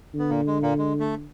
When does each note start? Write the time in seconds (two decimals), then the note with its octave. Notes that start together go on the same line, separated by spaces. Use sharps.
0.14 D3
0.19 B3
0.30 A#2 A#3
0.47 G#3
0.62 A#2 A#3
0.78 G#3
1.00 A3